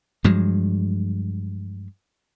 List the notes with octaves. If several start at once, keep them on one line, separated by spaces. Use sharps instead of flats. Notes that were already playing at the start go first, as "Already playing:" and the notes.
G2 F3 F#3 G#3